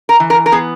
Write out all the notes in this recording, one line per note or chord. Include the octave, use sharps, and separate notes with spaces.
A#4
E3
A#4
A#4
B3 G#4